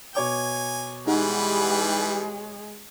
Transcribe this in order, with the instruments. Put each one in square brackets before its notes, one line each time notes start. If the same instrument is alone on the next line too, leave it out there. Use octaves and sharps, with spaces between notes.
[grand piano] B2 C#5 D6 [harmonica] G#5
[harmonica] E3 G3 B4 [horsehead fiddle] G#3 G#4 [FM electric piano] D#4 G4 F#5